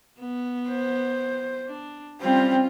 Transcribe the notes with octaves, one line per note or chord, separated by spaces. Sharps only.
B3
C5
D4
G3 C4 C#4 F4